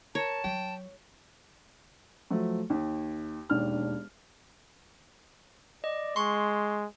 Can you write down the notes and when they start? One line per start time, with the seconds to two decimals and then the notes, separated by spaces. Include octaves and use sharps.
0.15 A#4 C#5 A5
0.44 F#3 G5
2.30 F3 F#3 A3
2.70 D#2
3.50 E1 D#2 D4 F6
5.84 D5 D#5
6.16 G#3 C6 C#6